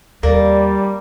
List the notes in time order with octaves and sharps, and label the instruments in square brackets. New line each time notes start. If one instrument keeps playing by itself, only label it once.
[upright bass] D#2 [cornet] G3 [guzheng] A#3 [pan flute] D5